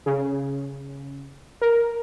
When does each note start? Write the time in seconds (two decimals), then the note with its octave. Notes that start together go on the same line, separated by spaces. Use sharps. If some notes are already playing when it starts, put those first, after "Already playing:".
0.06 C#3
1.62 A#4